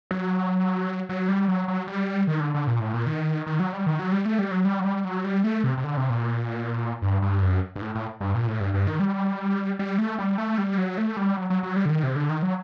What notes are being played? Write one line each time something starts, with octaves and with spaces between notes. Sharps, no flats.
F#3
F#3
G3
F#3
F#3
G3
D#3
D3
D3
A#2
A2
A#2
D#3
D#3
F#3
G3
D#3
F#3
G3
A3
G3
F#3
G3
F#3
G3
F#3
G3
A3
C3
C3
D3
C3
A#2
G2
G2
F#2
G2
A2
A2
G2
A#2
A2
G2
G2
D#3
G3
G3
A3
G3
A3
G3
F#3
A3
G3
F#3
F#3
F#3
G3
D3
D#3
C3
D3
D#3
F#3